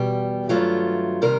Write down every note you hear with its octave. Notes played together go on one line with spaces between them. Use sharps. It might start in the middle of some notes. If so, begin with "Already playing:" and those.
Already playing: E2 B2 G3 G4
G2 D#3 F#3 A3 F4
C3 D#3 G3 A#4